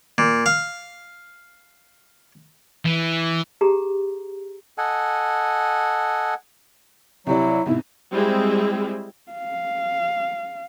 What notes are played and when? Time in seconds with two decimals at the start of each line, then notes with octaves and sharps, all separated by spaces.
0.18 A#2
0.46 F5
2.85 E3
3.61 G4 G#4 A#5
4.78 A4 D#5 F#5 G#5
7.27 C2 F#3 E4 G4 D5
7.66 C2 G#2 B2 E4
8.12 G3 G#3 C4 E4 G#4
9.32 F5